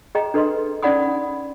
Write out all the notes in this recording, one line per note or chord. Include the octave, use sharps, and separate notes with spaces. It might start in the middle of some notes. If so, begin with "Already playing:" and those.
G#4 D#5 G5 A#5
D4 A4 B4 D#5 C6
C#4 D#4 D5 F#5 B5 D#6